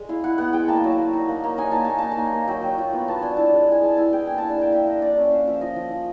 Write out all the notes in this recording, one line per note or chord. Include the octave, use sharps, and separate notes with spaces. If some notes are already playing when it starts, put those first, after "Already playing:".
Already playing: G#3
E4 F5
E4 F#5
B3 F#5
G#3 G5
A#3 A5
F#3
A#3
D#4
A#3
A#3
D#4 G#5
A#3 A5
A#3 G#5
D#4 A5
G#5
A#3
A#3
F#3 G5
F#3
F4
B3
B3 A5
D4 G#5
E4 A5
G#3
G#3 G#5
G#3 A5
E4 G#5
G#3 G5
A#3 G#5
D4 A5
G#5
A#3 G5
D4 E5
D4 D#5
D4 D5
C#4 E5
C#4 F5
F3 E5
F3 D#5
F3
F3